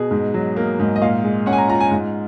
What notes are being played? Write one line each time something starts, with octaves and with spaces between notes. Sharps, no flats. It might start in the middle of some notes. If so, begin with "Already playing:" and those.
Already playing: B2 G#4
G#2
F#3
A#3
G#2
D#5
A#2 F5
G#3
C#4 F#5
G#5
A#5
F4 A#5
G#5
G#2